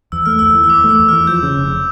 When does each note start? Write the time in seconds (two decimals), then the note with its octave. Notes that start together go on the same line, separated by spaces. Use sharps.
0.12 E2 E6
0.26 A3 F6
0.39 E2 E6
0.55 E3
0.64 E6
0.70 E2 D6
0.84 A3
0.89 E6
1.00 E2
1.09 E3 F6
1.27 F3 G6
1.43 C#3
1.57 F1